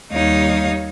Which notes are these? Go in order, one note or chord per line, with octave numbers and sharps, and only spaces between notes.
D#2 G3 D#4 C#5 F5 D#6